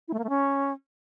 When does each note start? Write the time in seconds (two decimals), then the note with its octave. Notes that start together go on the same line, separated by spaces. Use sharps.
0.08 E4
0.13 A3
0.19 A#3
0.24 A3
0.29 C#4